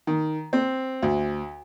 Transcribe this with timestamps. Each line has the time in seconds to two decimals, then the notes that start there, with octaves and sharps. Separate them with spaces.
0.07 D#3
0.53 C4
1.02 D2